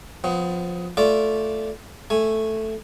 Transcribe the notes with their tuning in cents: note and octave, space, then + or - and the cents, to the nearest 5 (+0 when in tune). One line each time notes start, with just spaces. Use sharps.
F3 +20 B3 +30
A3 +0 F4 +0 D5 -15
A3 +0 G#5 +0